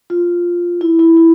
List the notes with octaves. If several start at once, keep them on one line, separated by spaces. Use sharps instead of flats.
F4
E4
E4
E4